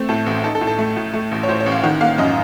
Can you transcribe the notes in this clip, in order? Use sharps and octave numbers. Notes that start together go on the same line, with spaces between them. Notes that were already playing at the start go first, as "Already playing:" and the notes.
Already playing: A3 C4
A2 A4
A1
D#4 A4
A4
A2
A4
A3
A2
A3
A1
C#5
A2 C5
C#5
A1
F5
D#3 F#5
A#3 F5
F#2 D#5